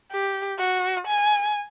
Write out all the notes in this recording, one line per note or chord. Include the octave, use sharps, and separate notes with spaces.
G4
F#4
G#5